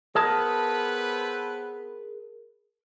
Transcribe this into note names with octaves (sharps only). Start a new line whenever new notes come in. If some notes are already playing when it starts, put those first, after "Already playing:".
B3 C4 G#4 A#4 B4 A5